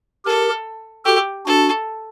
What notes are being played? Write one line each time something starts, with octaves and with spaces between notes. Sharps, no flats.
G4 A4 A#4
F#4 G4 A4
D4 F#4 A4